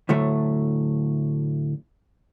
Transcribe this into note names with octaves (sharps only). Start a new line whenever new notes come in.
D2 A2 D3 F#3 A3